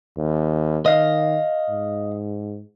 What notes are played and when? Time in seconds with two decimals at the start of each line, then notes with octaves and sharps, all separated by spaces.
0.17 D#2
0.86 D#3 D#5 F5
1.69 G#2